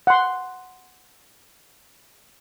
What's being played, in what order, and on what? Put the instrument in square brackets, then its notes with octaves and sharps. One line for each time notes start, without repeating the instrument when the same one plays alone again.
[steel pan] F#5 C6